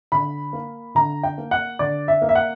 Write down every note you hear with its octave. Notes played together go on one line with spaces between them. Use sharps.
D3 B5
A#3
D3 A#5
G5
A#3
F#5
D3 D5
E5
A#3
E5
F#5